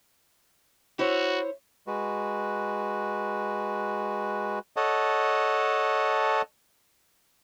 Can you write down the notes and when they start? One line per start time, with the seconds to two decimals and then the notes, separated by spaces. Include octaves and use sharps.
0.99 E4 F#4 C5 C#5
1.87 G#3 F#4 B4
4.76 A4 C#5 D#5 F#5 A5